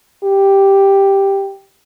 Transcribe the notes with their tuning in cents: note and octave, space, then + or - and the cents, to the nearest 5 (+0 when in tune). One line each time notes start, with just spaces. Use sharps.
G4 +0